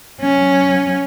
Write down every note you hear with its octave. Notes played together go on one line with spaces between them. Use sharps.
F#3 C#4